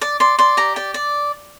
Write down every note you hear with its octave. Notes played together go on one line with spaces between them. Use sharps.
D5 D6
D5 C6
D5 C6
G4 A#5
D5 G5
D5